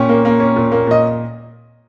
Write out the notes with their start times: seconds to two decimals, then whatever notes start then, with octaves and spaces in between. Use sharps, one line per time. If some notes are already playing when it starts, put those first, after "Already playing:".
Already playing: A#2 C#4 G5
0.09 A#3
0.25 A#3
0.40 C#4
0.56 A#2
0.72 A#3
0.87 A#2 D#5